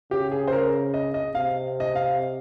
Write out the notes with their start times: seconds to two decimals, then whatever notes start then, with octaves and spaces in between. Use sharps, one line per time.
0.11 C#3 G4
0.32 G#4
0.48 C5
0.53 A#4
0.94 D#5
1.14 D#5
1.34 C3 F5
1.80 D#5
1.95 F5